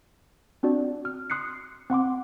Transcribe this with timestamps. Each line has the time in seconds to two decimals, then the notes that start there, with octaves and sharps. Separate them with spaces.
0.63 C4 D4 F#4 D5
1.05 F6
1.30 C6 D#6 F#6 C7 C#7
1.90 C4 F#5 C6 D6